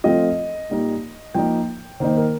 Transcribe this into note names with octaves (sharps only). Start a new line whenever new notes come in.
F3 A3 C4 F4 D#5
A#2 G3 A#3 D#4
F3 A#3 D#4 G5
D#3 A#3 D#4 C5
A#4